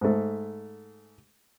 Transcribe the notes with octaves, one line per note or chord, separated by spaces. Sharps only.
G#2 A3